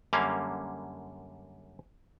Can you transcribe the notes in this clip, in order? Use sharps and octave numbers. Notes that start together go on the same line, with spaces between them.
F#2 D3 G3 A#3 C#4 F5